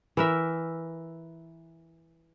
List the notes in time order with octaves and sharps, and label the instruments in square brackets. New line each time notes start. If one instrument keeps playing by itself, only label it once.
[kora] E3 A#4 E5